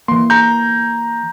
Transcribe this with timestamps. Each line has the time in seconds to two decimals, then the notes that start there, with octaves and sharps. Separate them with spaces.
0.08 E3 A#3 C6
0.30 A#5 G6